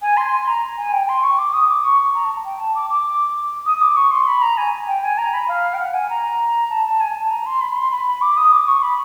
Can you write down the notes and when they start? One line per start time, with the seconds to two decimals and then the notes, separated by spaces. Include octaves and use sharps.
0.02 G#5
0.17 C6
0.32 C6
0.47 A#5
0.78 G#5
0.92 G5
1.08 C6
1.23 C#6
1.38 D6
1.53 D#6
1.68 D6
1.84 C#6
2.14 A#5
2.24 A5
2.44 G5
2.59 A5
2.75 D6
2.90 D6
3.66 D#6
3.81 D6
3.96 C#6
4.11 C6
4.27 B5
4.42 A#5
4.57 G#5
4.87 G5
5.03 G#5
5.18 A#5
5.33 B5
5.48 F5
5.74 G5
5.79 F#5
5.94 G#5
6.10 A#5
6.70 A5
6.85 A5
7.00 G#5
7.15 A5
7.30 A#5
7.46 C6
7.61 B5
7.76 C6
7.91 B5
8.07 B5
8.21 D6
8.37 D#6
8.52 D6
8.68 C#6
8.82 B5